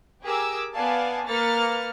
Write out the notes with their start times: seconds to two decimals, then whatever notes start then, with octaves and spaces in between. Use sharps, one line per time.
0.23 G4 G#4 A#4 D6 E6
0.73 B3 D5 F5 G#5 A5
1.27 A#3 B4 F6 A6 C#7